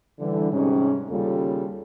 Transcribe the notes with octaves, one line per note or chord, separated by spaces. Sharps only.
D3 E3 G3
G#2 C3 G3 C#4
D#2 C#3 G3 A#3 F4 A4